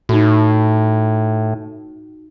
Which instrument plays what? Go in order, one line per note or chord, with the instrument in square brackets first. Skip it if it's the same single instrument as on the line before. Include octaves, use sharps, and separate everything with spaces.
[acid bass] A2 [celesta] D#4 F#4